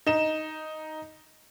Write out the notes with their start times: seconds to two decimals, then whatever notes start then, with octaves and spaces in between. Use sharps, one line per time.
0.07 D#4 E7